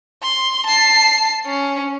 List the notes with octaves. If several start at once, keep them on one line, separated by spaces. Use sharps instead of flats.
C6
A5 C7
C#4